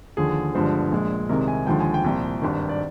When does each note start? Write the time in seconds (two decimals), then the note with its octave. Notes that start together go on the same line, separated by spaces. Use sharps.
0.17 D#2 D3 F3 G#4
0.55 G1 G2 D3 F3 G#3 C5
0.91 A#1 A#2 G#3
1.29 C2 C3 D#3 G#3 A#4
1.48 G#5
1.67 D#2 D3 F3 G#3 G5
1.80 G#5
1.94 G5
2.04 C2 A#2 F3
2.42 G#1 G2 D#3
2.69 D5